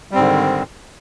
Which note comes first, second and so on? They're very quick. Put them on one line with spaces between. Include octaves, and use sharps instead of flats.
G3 C4 G#2 D3 D#3